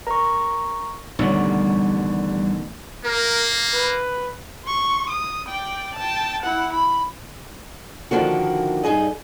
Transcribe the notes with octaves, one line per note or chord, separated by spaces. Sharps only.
A#4 A#5 C#6
A1 B2 D3 D#3 G3 C#5 D5 C#6
A#3 A#4
B4
C6 C#6
D#6
D5 G5
G5 A5
E4 F#5
B5
D3 D#3 F3 A#3 F#4
G2 D#4 G#4 D#5